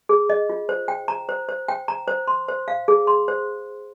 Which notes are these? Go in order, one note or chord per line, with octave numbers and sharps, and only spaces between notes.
G#4
D#5
F4
C5
G5
A#5
C5
C5
G5
A#5
C5
C6
C5
F5
G#4
C6
C5